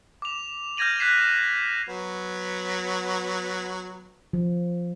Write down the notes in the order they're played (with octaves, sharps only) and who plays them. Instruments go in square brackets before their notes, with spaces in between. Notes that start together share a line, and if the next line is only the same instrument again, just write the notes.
[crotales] D6 F7
F6 G6 G#6 A#6 D#7 F#7
F#6 G#6 B6 C7 E7
D#7
[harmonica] F#3 B3
[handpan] F3